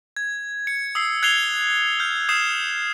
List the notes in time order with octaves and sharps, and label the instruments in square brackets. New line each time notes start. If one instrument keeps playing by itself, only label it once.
[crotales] G#6
C#7
D#6 E6 C7
F#6 G#6 C7 C#7 F7 G7
F6 G6
D#6 G6 C7 E7